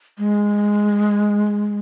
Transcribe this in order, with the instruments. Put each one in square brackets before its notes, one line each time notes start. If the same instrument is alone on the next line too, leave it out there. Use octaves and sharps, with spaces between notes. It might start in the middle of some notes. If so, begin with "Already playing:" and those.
[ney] G#3